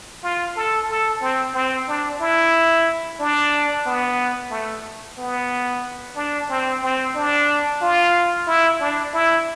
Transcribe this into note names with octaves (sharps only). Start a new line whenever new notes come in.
F4
A4
A4
C4
C4
D4
E4
D4
B3
A3
B3
D4
C4
C4
D4
F4
E4
D4
E4